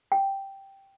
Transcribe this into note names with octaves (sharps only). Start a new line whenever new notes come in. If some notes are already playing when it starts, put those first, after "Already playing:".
G5